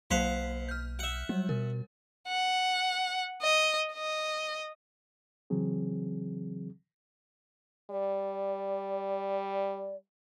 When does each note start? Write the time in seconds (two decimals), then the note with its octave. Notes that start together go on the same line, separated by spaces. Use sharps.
0.11 B1 F#3 A#3 C5 F5 F#5 B6
0.69 F6 G6
0.99 E5 F#5
1.29 F#3 G3
1.49 B2 A#4
2.28 F#5
3.42 D#5
3.93 D#5
5.50 C#3 E3 F#3 C4 G#4
7.90 G3 D5